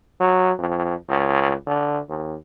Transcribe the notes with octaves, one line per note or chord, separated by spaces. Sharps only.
F#3
F2
C#2
D3
D#2